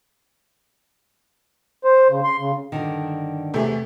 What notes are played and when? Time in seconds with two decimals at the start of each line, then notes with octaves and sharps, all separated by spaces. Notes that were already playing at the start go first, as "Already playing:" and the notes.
1.84 C5
2.10 C#3
2.24 C6
2.40 C#3
2.72 G2 D3 D#3
3.54 E2 C3 A3 G#4